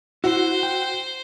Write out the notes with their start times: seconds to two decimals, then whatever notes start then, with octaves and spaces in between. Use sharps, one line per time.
0.24 E4 F#4 C5
0.63 G5